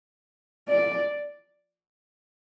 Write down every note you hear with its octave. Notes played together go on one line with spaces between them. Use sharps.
D5